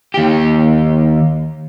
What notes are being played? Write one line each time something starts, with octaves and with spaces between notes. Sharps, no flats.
D#2 G4